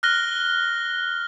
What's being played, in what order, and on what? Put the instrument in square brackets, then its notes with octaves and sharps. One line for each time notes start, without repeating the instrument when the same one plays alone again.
[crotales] F6 F#6 A#6 G7